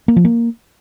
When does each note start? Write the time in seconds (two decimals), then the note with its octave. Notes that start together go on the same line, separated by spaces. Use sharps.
0.08 A#3
0.16 F3
0.25 A#3